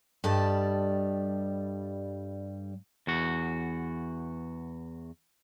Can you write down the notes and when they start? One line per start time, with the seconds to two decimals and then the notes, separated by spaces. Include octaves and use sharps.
0.24 G2 G3 A4 D5 D#5 A5
3.07 E2 F#4